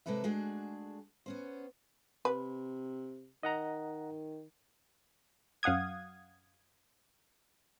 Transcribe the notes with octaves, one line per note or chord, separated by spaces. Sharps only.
C3 G#3 A#3 A4 B4 E5
G#3 A3 D4 F#4 G#4
B3 C#4 C5
C3 B4
D#3 D#5 F#5 A#5
F#2 F5 F#5 D#6 G#6